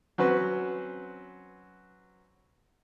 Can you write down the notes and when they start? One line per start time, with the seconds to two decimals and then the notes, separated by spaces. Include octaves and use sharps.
0.18 F#3 C4 C#4 B4